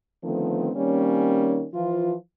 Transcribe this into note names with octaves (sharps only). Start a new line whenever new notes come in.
D3 D#3 F3 A3 B3 C4
D#3 G3 A#3 C4 C#4
E3 F3 F4